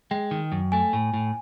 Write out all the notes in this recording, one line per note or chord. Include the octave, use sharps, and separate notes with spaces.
G#3 G5
D#3
F#2
A3 G#5
A2
A2